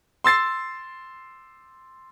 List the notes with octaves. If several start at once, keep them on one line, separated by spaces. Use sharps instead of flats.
C6 E6 A6 C7